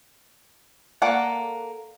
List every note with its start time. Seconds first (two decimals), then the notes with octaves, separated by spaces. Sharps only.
1.02 A#3 A4 A#4 D5 F#5